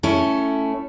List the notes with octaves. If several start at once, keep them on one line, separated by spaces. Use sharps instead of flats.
A3 C#4 E4